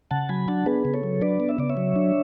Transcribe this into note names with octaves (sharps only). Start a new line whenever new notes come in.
C#3 F#5 A5
F#3 G#5 B5
D4 F#5 A5
B3 G#4 B4
C#3
A4 C#5
F#3
D4 B4 D5
B3
E5
C#3 D5
C#5 E5
F#3
D4